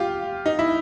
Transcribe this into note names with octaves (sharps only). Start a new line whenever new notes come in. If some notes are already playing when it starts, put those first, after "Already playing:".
Already playing: F4 G4
D#4
E4